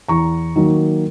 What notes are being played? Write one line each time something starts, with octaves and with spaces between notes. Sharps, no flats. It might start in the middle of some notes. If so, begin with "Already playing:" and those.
E2 A#5 C#6
D#3 F#3 A#3